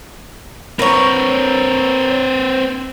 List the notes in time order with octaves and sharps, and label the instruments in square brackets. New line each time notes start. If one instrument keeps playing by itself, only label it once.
[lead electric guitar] C4 B4 [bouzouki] A#4 C#5